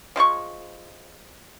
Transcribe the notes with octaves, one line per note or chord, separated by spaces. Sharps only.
F3 G#3 E4 C#6